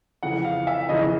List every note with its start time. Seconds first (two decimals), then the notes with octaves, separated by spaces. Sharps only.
0.23 F2 C#3 E3 F#5
0.45 F5
0.67 E5
0.89 F2 C#3 E3 D#5